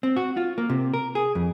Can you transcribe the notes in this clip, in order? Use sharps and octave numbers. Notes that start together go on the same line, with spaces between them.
C4
F#4
F4
A#3
C3
A#4
G#4
F2